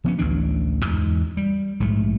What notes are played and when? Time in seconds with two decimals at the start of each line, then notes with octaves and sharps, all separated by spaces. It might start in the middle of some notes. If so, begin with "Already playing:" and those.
0.04 F3 B3 C#4
0.19 A1 D2 E3 D4
0.85 E2 G#2 G#3
1.37 G3
1.80 A#1 G#2 A3